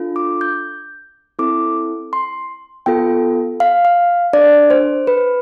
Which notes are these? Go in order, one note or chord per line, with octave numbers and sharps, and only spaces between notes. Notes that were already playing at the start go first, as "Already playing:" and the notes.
Already playing: D4 F4 A4
D6
G6
C4 E4 A4 D6
C6
B3 F4 A4 G5
F5
F5
D4 A4 D5
C5
B4